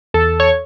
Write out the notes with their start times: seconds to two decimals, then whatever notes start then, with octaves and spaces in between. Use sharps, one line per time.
0.14 E2 A4
0.40 C#5